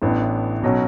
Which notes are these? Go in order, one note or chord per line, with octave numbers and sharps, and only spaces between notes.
A1 A2 E3 B3 D4
B1 B2 F#3 C#4 F#4